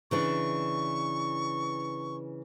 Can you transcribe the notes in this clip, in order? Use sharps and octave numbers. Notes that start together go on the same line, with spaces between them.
C#3 E3 D4 C#6